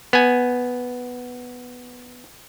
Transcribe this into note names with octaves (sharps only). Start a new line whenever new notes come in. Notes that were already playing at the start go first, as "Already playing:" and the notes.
B3 G#5